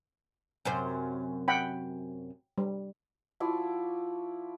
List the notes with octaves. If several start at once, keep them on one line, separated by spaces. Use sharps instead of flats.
F#2 C3 C5
F#5 G5 B5
G3
F3 E4 F#4 D5